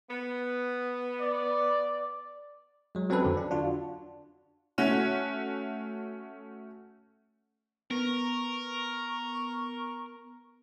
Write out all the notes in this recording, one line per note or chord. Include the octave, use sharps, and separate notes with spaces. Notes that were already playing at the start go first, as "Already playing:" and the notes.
B3
D5
F#3 G#3
F#3 C4 C#4 A4 B4
F2 D3
D4
D4 F4 F#4
A3 C#4 F#4
B3 A#4 C#6